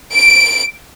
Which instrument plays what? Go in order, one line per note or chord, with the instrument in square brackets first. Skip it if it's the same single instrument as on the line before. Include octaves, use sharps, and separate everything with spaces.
[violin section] D7